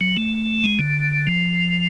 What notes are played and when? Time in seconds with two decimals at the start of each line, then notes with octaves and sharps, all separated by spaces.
0.01 F#3
0.17 A3
0.64 G#3
0.79 D3
1.27 F3